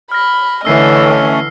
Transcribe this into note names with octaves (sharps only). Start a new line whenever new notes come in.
B5 F6 A#6
D3 E3 A3 C#4 D#5 E6 C7